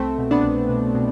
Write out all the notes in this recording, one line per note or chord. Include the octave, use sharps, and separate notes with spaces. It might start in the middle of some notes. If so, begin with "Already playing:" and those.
Already playing: C2 A3 C4
B2
B3 D4
C2
B2
B2